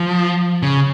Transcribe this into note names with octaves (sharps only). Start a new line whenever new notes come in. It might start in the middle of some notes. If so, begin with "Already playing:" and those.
Already playing: F3
C#3